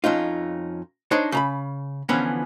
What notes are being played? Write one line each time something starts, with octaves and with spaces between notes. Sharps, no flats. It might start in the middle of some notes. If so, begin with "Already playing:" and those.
F2 C#4 D#4 F4
D4 D#4 C5 C#5
C#3 A#5 B5
D3 E3 F3 B3 C#4